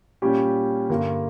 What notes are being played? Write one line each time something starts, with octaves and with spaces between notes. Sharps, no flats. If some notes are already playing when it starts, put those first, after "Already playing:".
A#2 G3 C#4 G4
G2 D3 A#3